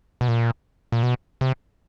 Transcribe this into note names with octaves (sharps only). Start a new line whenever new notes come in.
B2
A#2
A#2
B2
C3